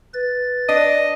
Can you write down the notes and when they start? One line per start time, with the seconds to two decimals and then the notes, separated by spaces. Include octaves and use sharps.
0.14 B4 A6
0.69 D4 D#5